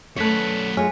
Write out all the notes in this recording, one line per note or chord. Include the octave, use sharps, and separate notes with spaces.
F#2 A3 B4 C#5 F#6 B6 C#7
G#3 F4 C#5 G#5 F6